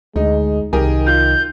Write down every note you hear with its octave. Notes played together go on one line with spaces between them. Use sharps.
D2 G#3 D#4
C2 D#3 G4 G#4 A#4
F4 G6